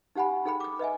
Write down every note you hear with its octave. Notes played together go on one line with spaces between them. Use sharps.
D#4 G4 F#5 G#5 B5
D#4 G#4 A4 G5 B5
D6 D#6
B4 D#5 E5 G#5